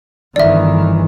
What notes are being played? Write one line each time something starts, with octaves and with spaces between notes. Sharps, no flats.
G1 D#3 E3 D5 E5